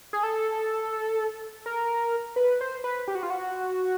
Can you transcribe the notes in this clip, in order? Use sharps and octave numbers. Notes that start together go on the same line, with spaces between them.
G#4
A4
A#4
B4
C5
B4
G4
F#4
F4
F#4